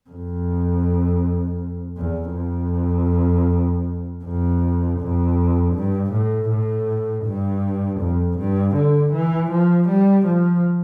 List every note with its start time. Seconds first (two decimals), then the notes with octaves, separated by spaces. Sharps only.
0.10 F2
1.97 E2
2.35 F2
4.24 F2
5.00 F2
5.75 G2
6.12 A2
6.49 A2
7.25 G2
8.00 F2
8.38 G2
8.76 D3
9.13 E3
9.51 F3
9.89 G3
10.26 F3